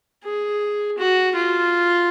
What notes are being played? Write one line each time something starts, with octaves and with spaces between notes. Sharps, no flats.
G#4
F#4
F4